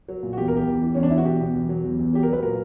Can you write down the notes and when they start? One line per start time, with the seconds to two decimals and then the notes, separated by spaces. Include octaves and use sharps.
0.08 F#3
0.23 A#2
0.33 F#4
0.37 E2 G4
0.48 A#4
0.52 E2 G4
0.67 E2
0.82 E3
0.95 E2 C#4
1.03 D4
1.10 E2 E4
1.18 F#4
1.25 B2 G4
1.41 B2
1.55 E2
1.69 F#3
1.84 E2
1.99 E2
2.13 F#3 G4
2.23 A#4
2.28 F#3 B4
2.42 A#2 A#4